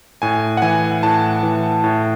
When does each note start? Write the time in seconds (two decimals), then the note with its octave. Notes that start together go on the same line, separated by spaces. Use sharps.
0.22 A2 G#5
0.57 F#5
0.62 E3 G#5
1.03 A2 A5
1.43 E3
1.84 A2